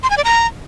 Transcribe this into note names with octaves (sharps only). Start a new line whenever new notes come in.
C6
G#5
D5
A#5